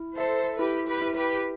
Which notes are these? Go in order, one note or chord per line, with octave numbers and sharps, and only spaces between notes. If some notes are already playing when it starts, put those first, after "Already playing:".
Already playing: E4
A4 C5 E5
E4 G4 B4
G4 B4
E4
G4 B4